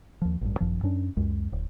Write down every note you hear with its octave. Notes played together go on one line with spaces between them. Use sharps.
D#2 F3
A1 G2
G#1 F#2 F3
F#2 C#4 D4
C#2 F#2 G#3
D1